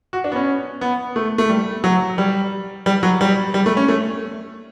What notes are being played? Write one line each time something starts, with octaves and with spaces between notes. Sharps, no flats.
F#4
D4
B3
C#4
B3
A3
A3
G3
F#3
G3
G3
F#3
G3
G3
A3
C#4
A3